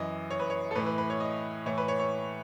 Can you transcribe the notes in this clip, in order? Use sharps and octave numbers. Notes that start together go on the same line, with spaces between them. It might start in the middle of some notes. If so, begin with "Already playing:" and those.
Already playing: F#2 E3 D#5
C#5
B4
C#5
A4
A2 E3 B4
B4
B4
C#5
D#5
A2 E3 C#5
B4
C#5
C#5